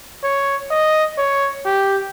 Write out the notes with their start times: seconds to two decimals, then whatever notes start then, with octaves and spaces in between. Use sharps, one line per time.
0.24 C#5
0.71 D#5
1.18 C#5
1.66 G4